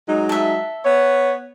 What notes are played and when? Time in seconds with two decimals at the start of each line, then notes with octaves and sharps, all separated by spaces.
0.09 F#3 G#3 D#4
0.29 A4 E5
0.85 B3 C#5